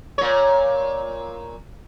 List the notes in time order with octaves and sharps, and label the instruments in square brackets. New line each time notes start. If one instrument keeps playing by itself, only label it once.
[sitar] A#2 C#5